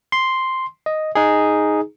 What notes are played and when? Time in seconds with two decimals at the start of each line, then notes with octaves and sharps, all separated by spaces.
0.12 C6
0.86 D#5
1.15 D#4 G#4